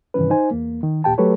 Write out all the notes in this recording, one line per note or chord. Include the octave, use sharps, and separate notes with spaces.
G2 C3 D#3 E3 C#4 B4
D#4 C5 G#5
E2 A#3
D#3
D#2 A#2 G4 G5 A5
F#3 A3 G4 A4 B4 C#5